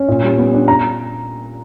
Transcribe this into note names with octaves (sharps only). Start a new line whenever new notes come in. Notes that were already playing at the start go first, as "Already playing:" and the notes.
Already playing: C#4
A#2
G3
B3
D4
A#5